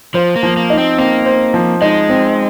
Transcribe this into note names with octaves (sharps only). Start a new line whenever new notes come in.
F3 C5
A#3
F3
A#3
D#4
C4
A#3 C4
C5
F3
G#3 D#4
C4